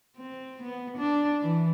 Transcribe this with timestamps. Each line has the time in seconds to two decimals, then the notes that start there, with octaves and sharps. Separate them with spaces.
0.16 C4
0.62 B3
0.97 D4
1.41 E3